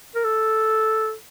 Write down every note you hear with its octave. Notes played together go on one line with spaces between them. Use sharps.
A#4
A4